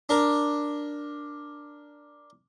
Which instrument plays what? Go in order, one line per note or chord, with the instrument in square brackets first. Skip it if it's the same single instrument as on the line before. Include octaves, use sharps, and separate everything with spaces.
[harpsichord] D4 A#4